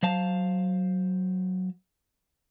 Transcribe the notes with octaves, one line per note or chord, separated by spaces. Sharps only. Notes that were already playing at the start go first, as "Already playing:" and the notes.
F#3 C5 F5 A5